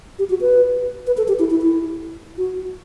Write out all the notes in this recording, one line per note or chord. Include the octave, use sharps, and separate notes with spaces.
G4
F#4
B4
B4
A4
G4
E4
E4
E4
F#4